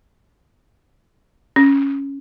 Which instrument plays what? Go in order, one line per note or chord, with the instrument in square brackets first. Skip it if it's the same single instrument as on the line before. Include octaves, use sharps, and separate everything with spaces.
[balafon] C#4